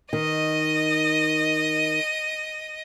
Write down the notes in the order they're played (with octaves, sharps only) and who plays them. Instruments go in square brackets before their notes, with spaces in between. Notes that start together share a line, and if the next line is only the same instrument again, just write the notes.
[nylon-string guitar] D#3 [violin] D#5 D#7